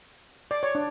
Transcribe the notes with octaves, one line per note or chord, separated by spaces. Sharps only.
D5
C#5
D4